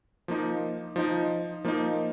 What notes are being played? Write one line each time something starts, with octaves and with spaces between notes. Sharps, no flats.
F3 A#3 D#4
F3 D#4
F3 A#3 D#4